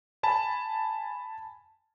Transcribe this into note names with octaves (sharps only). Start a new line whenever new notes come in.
G#5 A5 B5